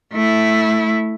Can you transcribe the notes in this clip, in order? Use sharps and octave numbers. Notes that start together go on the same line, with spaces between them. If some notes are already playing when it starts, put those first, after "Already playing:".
A3 E4